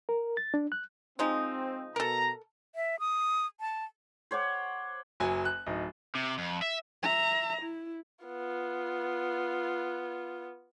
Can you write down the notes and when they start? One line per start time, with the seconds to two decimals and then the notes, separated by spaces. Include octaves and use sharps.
0.09 A#4
0.37 A6
0.54 D4
0.72 F#6
1.19 F3 G#3 C4 D#4
1.96 B2 A4 A#4 A#5
2.75 E5
2.99 D#6
3.60 A5
4.31 C5 C#5 F#5 D6
5.20 F#1 F#3 G#5
5.45 F#6
5.66 D1 D#4
6.15 C3
6.38 F2
6.62 E5
7.03 E5 A#5
7.62 E4
8.25 B3 F4